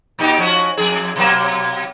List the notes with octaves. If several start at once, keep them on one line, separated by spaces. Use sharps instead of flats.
A#2 D#4 G4
F3 C#4 F#4
F2 G#4
B2 F#3 A#3